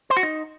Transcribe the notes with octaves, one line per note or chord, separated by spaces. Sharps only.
C5
F#4
D#4